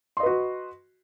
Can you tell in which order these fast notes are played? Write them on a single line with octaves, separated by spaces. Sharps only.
C6 D#5 B4 F#4